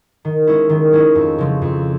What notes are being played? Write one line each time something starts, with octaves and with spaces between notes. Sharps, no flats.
D#3
G#3 C#4 E4
D#3
G#3 C#4 E4
F2
C#3 F3
F2